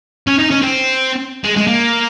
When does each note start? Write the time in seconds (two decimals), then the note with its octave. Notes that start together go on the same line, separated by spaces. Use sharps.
0.27 C#4
0.39 D#4
0.51 C#4
0.62 C4
1.44 G#3
1.56 G#3
1.67 A#3